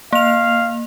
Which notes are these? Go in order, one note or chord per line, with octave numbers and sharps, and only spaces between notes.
A#3 F5 F7